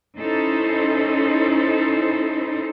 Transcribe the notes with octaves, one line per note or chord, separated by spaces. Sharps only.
C#4 D#4 E4 A4 C5